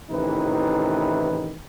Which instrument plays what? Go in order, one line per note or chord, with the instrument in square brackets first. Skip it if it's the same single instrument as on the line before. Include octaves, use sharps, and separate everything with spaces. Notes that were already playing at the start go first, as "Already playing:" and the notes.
[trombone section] A1 C3 D#3 E3 D#4 B4